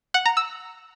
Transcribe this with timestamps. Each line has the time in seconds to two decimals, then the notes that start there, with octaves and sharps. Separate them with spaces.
0.14 F#5
0.26 A#5
0.37 E6